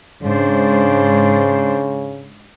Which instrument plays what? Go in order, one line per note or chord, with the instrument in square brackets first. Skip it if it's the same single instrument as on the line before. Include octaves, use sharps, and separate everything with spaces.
[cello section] G#2 D4 C5 [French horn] C#3